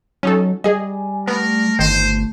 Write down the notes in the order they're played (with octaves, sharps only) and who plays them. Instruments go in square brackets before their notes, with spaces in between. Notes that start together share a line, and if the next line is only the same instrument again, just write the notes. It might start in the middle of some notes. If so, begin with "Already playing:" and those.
[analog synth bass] F#3 [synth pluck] C#4 D#4 A4
[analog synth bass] G3 [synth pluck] G#4 D#5 [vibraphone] G#5
[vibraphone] A3 [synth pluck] B3 [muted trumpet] A#4
[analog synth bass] G1 [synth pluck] D#3 [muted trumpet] C5